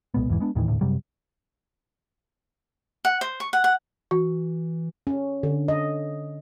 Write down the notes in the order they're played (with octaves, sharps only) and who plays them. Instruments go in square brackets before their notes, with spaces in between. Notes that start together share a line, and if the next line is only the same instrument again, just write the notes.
[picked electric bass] B1 A#2 G#3 B3
G#1 E2 G#2 E3
G#3 B3 D4
D#2 A2 D#3 E3
E1 D2 A2
F#2 C3 F#3 G3
[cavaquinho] F#5
C5
C#6
F#5
F#5
[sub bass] E3 [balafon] F#4
[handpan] C#4
D3
D#5